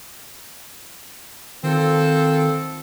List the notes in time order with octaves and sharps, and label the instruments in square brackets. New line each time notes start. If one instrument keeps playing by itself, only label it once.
[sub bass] D#3 [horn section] C4 F4 A4